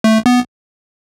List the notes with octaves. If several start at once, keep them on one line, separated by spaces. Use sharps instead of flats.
A3
B3